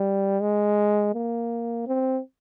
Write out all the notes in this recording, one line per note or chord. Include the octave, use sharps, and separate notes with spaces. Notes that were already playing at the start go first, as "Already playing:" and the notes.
Already playing: G3
G#3
A#3
C4